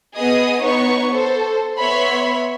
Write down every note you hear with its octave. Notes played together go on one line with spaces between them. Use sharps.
B3 G#4 D#5 D#6
B3 D#4 C#5 C#6
A4 C5
B3 C#5 E5 B5 C6